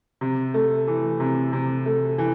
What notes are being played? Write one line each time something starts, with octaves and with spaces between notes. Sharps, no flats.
C3
A3
E3
C3
C3
A3
E3